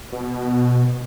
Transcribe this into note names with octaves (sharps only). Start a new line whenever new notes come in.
B2